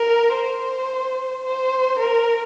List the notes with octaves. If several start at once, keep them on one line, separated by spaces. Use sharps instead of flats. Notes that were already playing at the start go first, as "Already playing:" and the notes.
Already playing: A#4
C5
C5
A#4